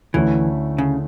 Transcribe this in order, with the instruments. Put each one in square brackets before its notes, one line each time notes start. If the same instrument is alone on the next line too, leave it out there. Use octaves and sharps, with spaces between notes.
[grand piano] D2 D3 A3 C#4 E4 [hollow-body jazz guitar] E3
[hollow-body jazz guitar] C#3